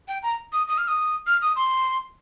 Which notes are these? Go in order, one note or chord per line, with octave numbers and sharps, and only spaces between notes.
G5
A#5
D#6
D#6
F6
D#6
F6
D#6
C6